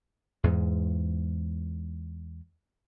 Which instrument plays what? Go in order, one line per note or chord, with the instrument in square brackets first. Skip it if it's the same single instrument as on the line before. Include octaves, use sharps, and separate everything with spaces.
[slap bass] E2 G#2 G#3